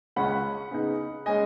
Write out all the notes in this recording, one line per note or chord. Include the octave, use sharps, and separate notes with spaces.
C#2 C#3 G#3 C#4 F#5 B5
C#3 B3 D#4
G#3 C#4 D#5 G#5